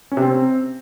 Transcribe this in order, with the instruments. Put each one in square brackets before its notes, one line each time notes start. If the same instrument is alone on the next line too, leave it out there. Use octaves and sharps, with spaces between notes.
[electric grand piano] C#4
C3
C4